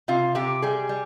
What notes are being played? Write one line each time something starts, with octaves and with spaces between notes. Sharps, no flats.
C3 F4
C3 G4
G3 G#4
G3